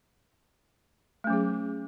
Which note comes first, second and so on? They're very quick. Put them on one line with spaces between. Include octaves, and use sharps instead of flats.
A3 C#4 F#3 G#4